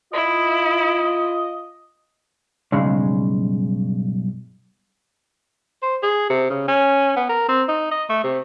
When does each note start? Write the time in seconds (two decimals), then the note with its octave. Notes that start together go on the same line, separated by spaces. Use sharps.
0.13 E4 F4 D#5
2.72 B1 G2 C#3 G#3
5.82 C5
6.03 G#4
6.30 C3
6.50 C#3
6.68 C#4
7.17 B3
7.29 A#4
7.48 C4
7.68 D#4
7.91 D#5
8.09 A3
8.23 C3